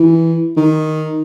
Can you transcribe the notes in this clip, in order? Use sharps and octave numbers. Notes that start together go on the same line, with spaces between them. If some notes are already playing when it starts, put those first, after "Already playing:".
Already playing: E3
D#3